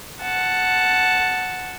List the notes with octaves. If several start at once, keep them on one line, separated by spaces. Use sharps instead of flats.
F#5 A5